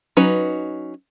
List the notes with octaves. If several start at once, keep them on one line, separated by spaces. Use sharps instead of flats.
F#3 C#4 D#4 B4